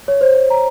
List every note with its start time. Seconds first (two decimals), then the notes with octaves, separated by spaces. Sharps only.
0.08 C#5
0.21 C5
0.36 C5
0.50 A#5